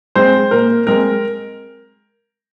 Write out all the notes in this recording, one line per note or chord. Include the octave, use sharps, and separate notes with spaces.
G#3 C4 C5
A#2 A#4
G#3 C4 A#4